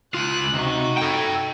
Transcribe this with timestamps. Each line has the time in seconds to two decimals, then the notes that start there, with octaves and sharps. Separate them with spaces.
0.14 C#2 F4 F#6
0.54 C3 D#4 F#4
0.98 A4 G5